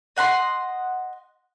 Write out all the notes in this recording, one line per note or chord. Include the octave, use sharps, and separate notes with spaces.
D#5 F#5 B5 C6